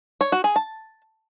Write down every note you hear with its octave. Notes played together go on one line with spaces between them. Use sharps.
C#5
F#4
G#4
A5